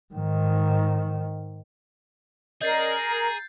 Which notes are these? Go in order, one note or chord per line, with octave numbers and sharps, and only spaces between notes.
G#2 D#3
C#4 G#4 A#4 D5 D#5 G6 A6 C7
A#5